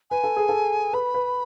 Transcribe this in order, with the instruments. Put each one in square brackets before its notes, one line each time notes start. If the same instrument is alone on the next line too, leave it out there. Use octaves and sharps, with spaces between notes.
[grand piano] B4 [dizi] G#5
[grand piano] A4
G#4
A4
[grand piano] B4 [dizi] B5
[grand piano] B4